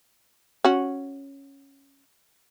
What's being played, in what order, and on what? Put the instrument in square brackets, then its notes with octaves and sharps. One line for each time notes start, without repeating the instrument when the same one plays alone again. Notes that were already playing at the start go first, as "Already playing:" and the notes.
[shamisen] C#4 F#4